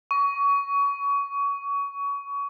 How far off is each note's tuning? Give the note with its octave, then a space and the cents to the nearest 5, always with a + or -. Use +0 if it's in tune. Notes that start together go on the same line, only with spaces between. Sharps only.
C#6 +25